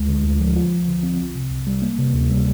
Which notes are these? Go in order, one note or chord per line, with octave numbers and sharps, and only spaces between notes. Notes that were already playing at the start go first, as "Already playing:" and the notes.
Already playing: D2 G#3
D3
D2
F3
F4
F3
D3
C4
C2
C3
C2
G3
A#3
C3
D2
G3